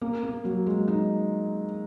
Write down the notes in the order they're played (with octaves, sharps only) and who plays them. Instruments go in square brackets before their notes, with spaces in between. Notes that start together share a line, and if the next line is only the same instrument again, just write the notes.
[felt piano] A#3
A#3
F#3
G#3
D#4